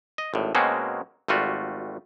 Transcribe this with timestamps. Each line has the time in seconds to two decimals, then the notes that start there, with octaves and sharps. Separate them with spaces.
0.18 D#5
0.34 G#1 A2
0.55 B2 G#3 A#3 C4 C#4 F#4
1.28 G#1 G3 A3 F4 F#4